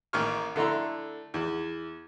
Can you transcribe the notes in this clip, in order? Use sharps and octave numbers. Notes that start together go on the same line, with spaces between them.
A1 D#3 A#3 C#6 F6
D3 A3 E4 A#5 C6
E2